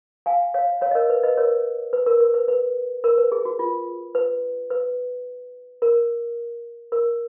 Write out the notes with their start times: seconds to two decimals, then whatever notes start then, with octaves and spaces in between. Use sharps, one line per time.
0.26 F5 G#5
0.54 C#5 F5
0.81 C#5 F5
0.91 D#5
0.95 A#4 C#5
1.10 B4
1.23 B4 D#5
1.37 A#4 C#5
1.93 B4
2.06 A#4
2.21 A#4
2.34 B4
2.48 B4
3.04 A#4
3.18 B4
3.32 G#4
3.45 F#4
3.59 F4
4.15 B4
4.70 B4
5.82 A#4
6.92 A#4